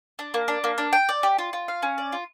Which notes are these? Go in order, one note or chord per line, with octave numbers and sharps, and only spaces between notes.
D4
A#3
D4
A#3
D4
G5
D5
G4
F4
F4
F5
C#4
D5
F4